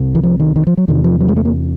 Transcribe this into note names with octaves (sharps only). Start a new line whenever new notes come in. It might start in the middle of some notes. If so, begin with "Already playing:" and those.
Already playing: C2 C3
E3
F3
D#3
D#3
F3
F#3
E2 C3 D#3
F3
F#3
G#3
A3
A#3